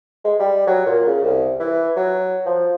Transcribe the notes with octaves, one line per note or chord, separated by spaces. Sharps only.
G#3
G3
F#3
A#2
C#3
C2
E3
F#3
F3